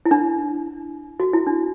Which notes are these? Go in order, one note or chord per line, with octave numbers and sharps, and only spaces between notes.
E4
D4
F#4
E4
D4